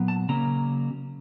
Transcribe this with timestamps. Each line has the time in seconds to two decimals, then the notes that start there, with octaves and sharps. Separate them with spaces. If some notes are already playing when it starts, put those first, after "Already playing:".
Already playing: A#2 F#3 B3
0.08 A5
0.29 C#3 F#3 A#3 C#4 A#5